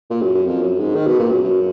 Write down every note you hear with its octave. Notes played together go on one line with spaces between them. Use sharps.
A#2
F#2
F#2
F2
F#2
G#2
D#3
B2
A#2
F#2
F#2